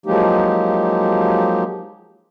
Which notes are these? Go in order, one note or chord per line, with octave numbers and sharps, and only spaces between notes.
F3 F#3 G#3 A#3 D#4 G4